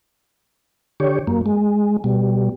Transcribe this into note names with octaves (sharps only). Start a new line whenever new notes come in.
D3 G4 C#5
F#2 A#3
G#3
B2 G3